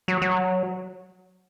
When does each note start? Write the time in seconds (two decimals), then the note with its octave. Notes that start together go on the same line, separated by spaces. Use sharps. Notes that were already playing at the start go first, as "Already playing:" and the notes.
0.08 F#3
0.22 F#3